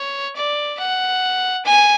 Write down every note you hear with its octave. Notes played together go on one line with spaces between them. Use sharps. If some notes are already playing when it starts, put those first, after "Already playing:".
Already playing: C#5
D5
F#5
G#5